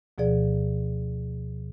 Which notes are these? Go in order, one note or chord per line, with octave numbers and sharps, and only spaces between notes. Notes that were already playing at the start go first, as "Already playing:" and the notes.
D2 B2 F3 G#4 D5